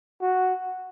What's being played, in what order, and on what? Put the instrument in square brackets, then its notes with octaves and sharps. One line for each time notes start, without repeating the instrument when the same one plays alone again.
[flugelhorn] F#4